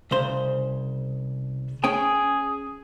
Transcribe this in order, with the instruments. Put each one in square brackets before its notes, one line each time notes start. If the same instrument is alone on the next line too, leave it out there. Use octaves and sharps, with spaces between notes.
[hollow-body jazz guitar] C2 C#3 C5
[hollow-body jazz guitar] C#4 G5 G#5 [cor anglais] G#4